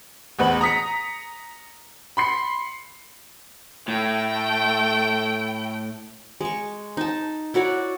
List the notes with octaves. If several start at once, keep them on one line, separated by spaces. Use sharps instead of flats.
A1 E2 B4 F#7
A#5 D#6 B6 C#7
B5 C6 C7 C#7
A2 A3 G5
G#3 C#6
D#4 A5
E4 F#4 C#5 D5